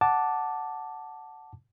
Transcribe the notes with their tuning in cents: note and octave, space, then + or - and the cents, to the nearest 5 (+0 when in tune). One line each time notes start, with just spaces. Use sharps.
F#5 +0 A5 +0 D6 +0